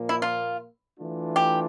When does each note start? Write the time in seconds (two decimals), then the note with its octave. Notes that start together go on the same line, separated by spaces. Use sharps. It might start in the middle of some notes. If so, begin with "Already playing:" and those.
Already playing: A#2 F3 A#3
0.09 E4
0.22 F4
0.98 E3 A3 D4 F4
1.36 G4